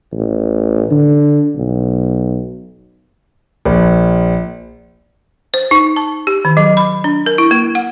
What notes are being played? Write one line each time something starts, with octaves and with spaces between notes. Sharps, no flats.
A1
D3
B1
A#1
C5
D#4
A5
G4
D#3
F#3
B5
D4
A#4
E4
A#3
F#5